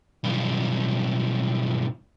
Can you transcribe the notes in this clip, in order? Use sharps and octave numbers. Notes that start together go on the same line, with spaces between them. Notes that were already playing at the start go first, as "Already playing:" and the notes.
B1 G2